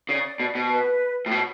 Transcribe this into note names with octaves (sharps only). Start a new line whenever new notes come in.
C#3 D5
B2
B2
B4
A2
B2 C#5